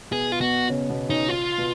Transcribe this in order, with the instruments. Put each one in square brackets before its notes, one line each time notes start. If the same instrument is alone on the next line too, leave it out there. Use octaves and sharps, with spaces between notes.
[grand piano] B2 B3 [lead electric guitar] G#4
[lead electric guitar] F4
[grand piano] B2 B3 [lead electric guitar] F#4
[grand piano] C#3 C#4
B2 B3
[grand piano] C#3 C#4 [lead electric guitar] D#4
[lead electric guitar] F4
[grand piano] B2 B3